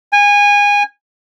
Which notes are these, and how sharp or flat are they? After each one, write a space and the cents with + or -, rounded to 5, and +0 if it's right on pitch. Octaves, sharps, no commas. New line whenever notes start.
G#5 -25